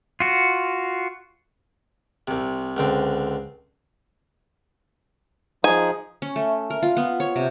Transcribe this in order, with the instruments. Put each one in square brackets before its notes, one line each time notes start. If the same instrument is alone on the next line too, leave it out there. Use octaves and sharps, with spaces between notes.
[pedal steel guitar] F4 F#4
[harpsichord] C2 C3
C#2 D3 C4
[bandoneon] F3 D#4 G#4 [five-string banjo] G#5
[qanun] C#4
A3
A#4
F4
B3
C#5
C3